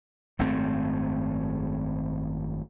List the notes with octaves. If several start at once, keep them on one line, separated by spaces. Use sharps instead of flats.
G#1 F#2 A3 C4